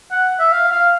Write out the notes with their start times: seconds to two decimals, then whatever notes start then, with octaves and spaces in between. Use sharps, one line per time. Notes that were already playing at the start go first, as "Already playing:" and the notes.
0.11 F#5
0.39 E5
0.52 F5
0.72 F5